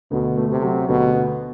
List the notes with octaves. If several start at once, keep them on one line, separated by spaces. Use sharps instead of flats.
D2 B2
A3
C3
F#3
D2 B2
B3